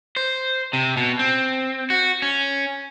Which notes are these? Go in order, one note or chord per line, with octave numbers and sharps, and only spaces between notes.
C5
C3
B2
C4
F#4
C#4